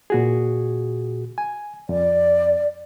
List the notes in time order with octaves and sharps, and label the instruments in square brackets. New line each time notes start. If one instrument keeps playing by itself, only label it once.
[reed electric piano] A#2 F#4 G#4
G#5
[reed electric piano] F2 [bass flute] D5